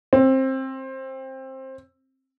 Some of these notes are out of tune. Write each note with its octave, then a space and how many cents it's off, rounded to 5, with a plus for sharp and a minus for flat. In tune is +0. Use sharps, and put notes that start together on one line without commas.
C4 +20